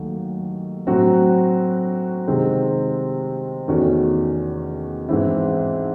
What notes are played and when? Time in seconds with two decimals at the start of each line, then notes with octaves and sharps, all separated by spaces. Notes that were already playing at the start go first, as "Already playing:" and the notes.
Already playing: D#2 D#3 F#3 A3
0.87 A2 F#3 C4 F#4
2.27 C3 D#3 G#3 C4
3.68 E2 D#3 A3 C#4 F#4
5.09 G#2 E3 C4 E4